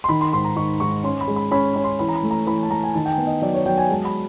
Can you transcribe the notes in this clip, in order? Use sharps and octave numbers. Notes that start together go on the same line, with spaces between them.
C6
D#3 B5
C6
G#2 C6
A#5
D#3 C#6
G#2 C#6
C#4 C6
B5
G#3
B5
C#4 B5
C#4 B5
C6
E3 B5
A#5
B5
A3
A#5
E3 B5
A5
A3 A#5
G#5
D#3 A5
G5
G#5
B3
D#5
F#3 D5
C#5
F#3 G5
G#5
G#3 A5
B5